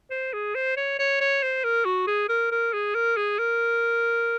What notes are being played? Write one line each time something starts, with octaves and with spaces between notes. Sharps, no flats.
C5
G#4
C5
C#5
C#5
C#5
C5
A#4
F#4
G#4
A#4
A#4
G#4
A#4
G#4
A#4